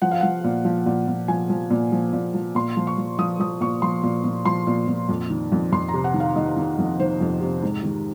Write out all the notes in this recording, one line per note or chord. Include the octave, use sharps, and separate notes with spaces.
F3 F#5
F5
F3 F#5
A#2
F3
A#2
A#2
F3 G#5
F3
A#2
F3
A#2
F3
A#2 C6
F3
C#6
F3
F3 D#6
F3 D#6
A#2 C#6
F3 C6
A#2
A#2
F3 C6
A#2
A#2
F2
D#3
F2
F2 C6
A#5
C3
F#5
D#3
F5
D#3 D#5
D#3
F2
D#3 C5
F2
C3
G#2
D#3